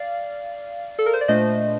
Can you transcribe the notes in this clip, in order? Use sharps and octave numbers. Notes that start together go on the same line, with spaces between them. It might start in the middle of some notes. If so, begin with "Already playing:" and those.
Already playing: D5 F5
A4
A#4
C5
D5
A#2 A3 D4 C5 D#5